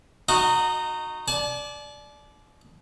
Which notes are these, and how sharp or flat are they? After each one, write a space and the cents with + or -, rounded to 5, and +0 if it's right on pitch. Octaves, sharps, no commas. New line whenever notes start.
D#4 -20 F#4 -10 D#5 +0
D5 +0 A5 -45